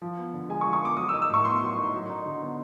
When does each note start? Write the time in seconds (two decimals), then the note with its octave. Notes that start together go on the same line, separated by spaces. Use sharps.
0.02 F3
0.18 B3
0.34 D3
0.49 G#3 G#5
0.61 C#6
0.66 F3
0.73 C#6
0.82 B3 D6
0.97 F#3 D#6
1.09 D#4 E6
1.22 E6
1.30 A2 C#6
1.45 B3 C6
1.61 F#3
1.77 D#4
1.94 F#3
2.10 D#4
2.26 D3
2.42 B3